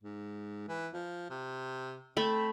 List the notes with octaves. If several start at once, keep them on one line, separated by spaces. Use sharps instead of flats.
G#2
E3
F3
C3
A3 C4 E5 B5